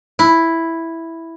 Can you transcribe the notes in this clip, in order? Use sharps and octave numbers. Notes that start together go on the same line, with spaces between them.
E4